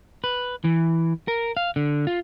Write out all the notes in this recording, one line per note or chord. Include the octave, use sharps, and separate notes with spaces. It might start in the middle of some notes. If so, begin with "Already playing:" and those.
B4
E3
A#4
F5
D3
F4